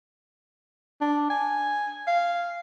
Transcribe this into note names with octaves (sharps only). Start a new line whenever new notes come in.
D4
G#5
F5